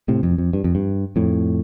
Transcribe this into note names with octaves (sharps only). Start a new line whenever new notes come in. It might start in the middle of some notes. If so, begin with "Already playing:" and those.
A2 C3
F2
F2
G2
F2
G2
F2 A2